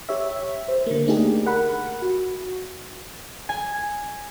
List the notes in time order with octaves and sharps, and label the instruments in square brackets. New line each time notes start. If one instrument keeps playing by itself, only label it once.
[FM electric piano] G4 C#5 E5
C5
D3 A#3
A3 A#3 D4 D#4 G4 G#4
A#4 F#5 B5
F#4
[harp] G#5